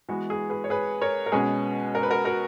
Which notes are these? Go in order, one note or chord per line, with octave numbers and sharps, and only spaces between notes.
E3 G#3 B3 F#4
G#4
G#4 B4
C#5
G#4 B4
A#4 C#5
A#4
B2 G#3 C#4 G#4 B4
A#4
B4
F#4 A#4
F#4 A#4